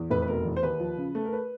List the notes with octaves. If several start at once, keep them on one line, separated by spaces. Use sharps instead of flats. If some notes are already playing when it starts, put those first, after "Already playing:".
Already playing: E2
F1 B4
B4
B2 A#4
E2
C5
D#2 B4
F3
C#3
A3
A#4
B4